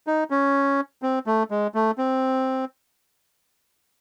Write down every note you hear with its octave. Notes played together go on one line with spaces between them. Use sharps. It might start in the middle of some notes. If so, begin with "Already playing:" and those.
D#4
C#4
C4
A3
G#3
A3
C4